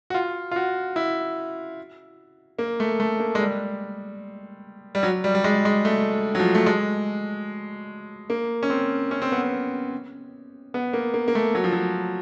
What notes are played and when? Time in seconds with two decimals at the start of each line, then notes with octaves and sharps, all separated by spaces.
0.10 F#4
0.14 F4
0.51 F4
0.56 F#4
0.96 E4
2.59 A#3
2.80 A3
3.00 A3
3.20 A#3
3.35 G#3
3.40 G3
4.95 G3
5.03 F#3
5.24 G3
5.35 G3
5.44 G#3
5.65 G#3
5.85 A3
6.35 F#3
6.39 F3
6.55 A3
6.66 G#3
8.30 A#3
8.63 C#4
8.70 C4
9.11 C#4
9.22 C4
9.32 B3
9.42 C4
10.74 B3
10.93 A#3
11.14 A#3
11.28 A#3
11.35 A3
11.55 F#3
11.64 F3
11.73 F#3